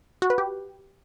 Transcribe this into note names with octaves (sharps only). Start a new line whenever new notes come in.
F#4
B4
G4